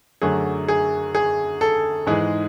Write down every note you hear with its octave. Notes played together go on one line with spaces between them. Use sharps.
F#2 D3 F#3 A3 G#4
G#4
G#4
A4
G#2 E3 G#3 G#4